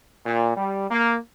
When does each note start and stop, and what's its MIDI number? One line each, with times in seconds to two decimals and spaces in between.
0.24 0.55 46
0.55 0.86 55
0.90 1.17 58